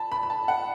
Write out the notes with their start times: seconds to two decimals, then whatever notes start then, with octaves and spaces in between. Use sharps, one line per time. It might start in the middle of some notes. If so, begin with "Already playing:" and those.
Already playing: A5 B5
0.12 B5
0.23 B5
0.30 A5
0.48 F#5